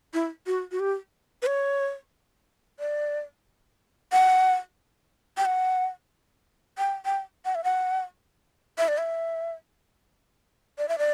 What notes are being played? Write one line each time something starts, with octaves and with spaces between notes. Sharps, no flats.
E4
F#4
F#4
G4
B4
C#5
D5
F#5
G5
F#5
G5
G5
F#5
E5
F#5
E5
D5
E5
D5
E5
D5